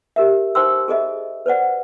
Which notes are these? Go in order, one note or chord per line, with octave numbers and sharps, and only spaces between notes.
G4 A#4 E5
D#4 C5 G5 C6 E6
G#4 A4 D#5 E5
B4 C5 D5 F#5